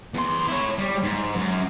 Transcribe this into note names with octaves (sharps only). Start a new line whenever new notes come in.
E2 C6
E4 C#5
G3
G#2
F#2